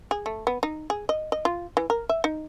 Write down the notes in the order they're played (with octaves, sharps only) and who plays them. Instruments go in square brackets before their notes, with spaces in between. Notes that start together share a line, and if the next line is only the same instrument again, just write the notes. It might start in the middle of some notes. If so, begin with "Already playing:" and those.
[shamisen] G#4
A3
B3
D#4
G#4
D#5
D#5
F4
E3
A#4
E5
D#4